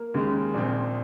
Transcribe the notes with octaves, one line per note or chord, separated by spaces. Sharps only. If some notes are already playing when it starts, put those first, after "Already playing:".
Already playing: A#3 A#4
D#2 C#3 G#3
A#1 A#2 F3 C4